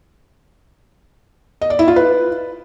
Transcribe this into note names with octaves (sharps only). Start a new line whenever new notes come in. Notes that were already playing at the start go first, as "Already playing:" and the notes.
D#5
D5
E4
F4
B4